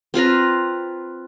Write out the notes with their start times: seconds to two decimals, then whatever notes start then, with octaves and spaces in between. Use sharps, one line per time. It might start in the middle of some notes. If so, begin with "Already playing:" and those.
0.14 C4 F4 B4 A#5